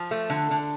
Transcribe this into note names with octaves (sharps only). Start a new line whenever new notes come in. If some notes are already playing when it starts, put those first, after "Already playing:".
Already playing: F3
A3
D3
D3